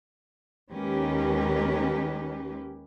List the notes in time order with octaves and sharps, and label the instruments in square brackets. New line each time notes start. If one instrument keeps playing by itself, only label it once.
[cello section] D#2 D#3 G#3 C#4 G4 B4